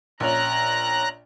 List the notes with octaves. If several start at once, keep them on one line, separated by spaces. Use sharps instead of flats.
A#1 C#4 A#5 F#6 F7